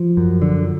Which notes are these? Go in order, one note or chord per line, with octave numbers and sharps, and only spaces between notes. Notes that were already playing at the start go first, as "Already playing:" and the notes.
Already playing: F3
F#2
D3